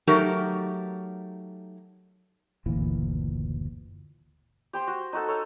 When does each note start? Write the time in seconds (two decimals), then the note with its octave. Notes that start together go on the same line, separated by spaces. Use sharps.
0.07 F#3 A3 D#4 G4 A#4
2.66 F#1 D2 A#2 E3
4.73 G4 C5 C6
4.87 F#4
5.13 D#4 F#4 A4
5.28 A4 C#5 C#6